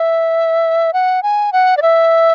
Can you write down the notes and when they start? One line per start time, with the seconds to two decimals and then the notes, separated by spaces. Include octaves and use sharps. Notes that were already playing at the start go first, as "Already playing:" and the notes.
Already playing: E5
0.93 F#5
1.23 G#5
1.53 F#5
1.77 D5
1.82 E5